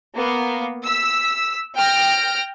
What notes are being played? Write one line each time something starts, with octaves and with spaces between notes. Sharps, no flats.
A#3 B3
E6 B6
G5 F6 A#6 D7